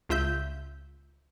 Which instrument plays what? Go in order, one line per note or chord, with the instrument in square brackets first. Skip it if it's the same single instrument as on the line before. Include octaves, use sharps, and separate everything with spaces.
[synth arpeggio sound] C#2 F4 E5 G6